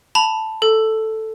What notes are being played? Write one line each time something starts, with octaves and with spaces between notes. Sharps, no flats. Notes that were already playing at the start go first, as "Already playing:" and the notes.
A5 B5 F7
A4